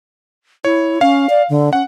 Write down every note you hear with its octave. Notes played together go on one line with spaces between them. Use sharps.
E4 C#5
C#4 F5
D5
D3
C#4 F#5